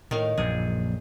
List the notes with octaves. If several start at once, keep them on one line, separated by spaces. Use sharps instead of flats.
A2 D#3 F5
A#1 F#2 A#2 G#4